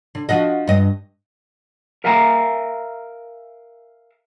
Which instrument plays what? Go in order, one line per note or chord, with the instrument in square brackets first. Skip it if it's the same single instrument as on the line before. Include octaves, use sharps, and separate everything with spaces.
[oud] D3
F3 F#4 D#5
G2 D#5
[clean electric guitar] A#4 E5 F5 G#5 A#5